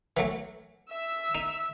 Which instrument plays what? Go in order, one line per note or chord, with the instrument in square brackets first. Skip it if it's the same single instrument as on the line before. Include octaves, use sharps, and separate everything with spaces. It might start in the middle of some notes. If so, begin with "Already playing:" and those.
[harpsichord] E3 F#3 A3
[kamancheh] E5 E6
[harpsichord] D#4